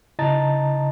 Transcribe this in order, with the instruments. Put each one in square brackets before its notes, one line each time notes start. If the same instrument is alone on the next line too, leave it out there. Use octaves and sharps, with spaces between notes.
[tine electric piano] C#3 E4 D#5 A5 A#5 A6